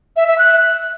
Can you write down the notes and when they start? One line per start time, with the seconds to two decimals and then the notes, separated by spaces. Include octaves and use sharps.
0.16 E5
0.27 E5
0.38 F#6